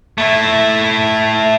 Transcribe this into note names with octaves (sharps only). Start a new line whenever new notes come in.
A3 E4